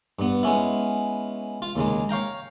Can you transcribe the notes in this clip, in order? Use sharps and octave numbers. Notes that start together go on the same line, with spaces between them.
G2 B3
G#3 B3 C#4 E4
F4
D#2 C#3 G#3
C#5 F5 G5 A#5